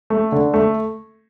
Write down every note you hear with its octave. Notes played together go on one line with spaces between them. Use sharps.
A3
D3
A3